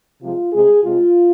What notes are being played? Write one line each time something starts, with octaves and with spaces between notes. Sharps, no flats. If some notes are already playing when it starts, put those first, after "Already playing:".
C3 F3 G#3 F4
C3 G#3 G#4
C3 G#3 F4